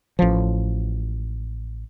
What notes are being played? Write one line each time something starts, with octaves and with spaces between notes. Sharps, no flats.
A1 F3